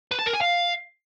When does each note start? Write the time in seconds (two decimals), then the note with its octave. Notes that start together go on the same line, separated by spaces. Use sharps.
0.11 B4
0.19 A5
0.26 A#4
0.33 G#5
0.41 F5